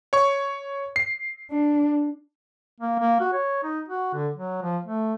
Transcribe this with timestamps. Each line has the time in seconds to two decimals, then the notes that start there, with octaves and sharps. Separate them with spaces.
0.13 C#5 C#6
0.96 C7
1.51 D4
2.80 A#3
2.99 A#3
3.21 F#4
3.33 C#5
3.64 D#4
3.89 F#4
4.14 D3
4.36 F#3
4.62 F3
4.86 A3